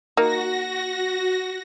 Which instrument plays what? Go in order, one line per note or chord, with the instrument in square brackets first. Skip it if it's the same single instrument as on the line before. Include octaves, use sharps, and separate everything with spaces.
[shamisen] A#3 D#4 [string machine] F#4 A#6